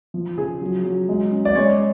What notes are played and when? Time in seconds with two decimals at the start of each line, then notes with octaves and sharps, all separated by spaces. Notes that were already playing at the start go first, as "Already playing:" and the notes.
0.14 F3
0.37 C#3 G#4
0.61 F#3
0.85 F#3
1.09 G#3
1.32 C#4
1.45 D5
1.55 G#3 C#5